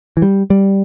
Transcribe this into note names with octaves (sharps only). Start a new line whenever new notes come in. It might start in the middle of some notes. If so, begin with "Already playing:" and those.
E3
G3
G3